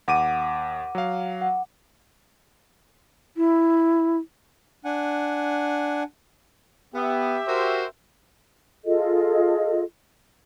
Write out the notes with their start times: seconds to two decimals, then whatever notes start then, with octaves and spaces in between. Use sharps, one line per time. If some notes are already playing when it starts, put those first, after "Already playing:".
0.08 D#2 F#5 D6 D#7
0.95 F#3 F5
1.41 F#5
3.37 E4
4.85 D4 F#5 G#5
6.95 B3 G4 E5
7.48 F#4 A#4 C5
8.85 F4 G#4 A4 D#5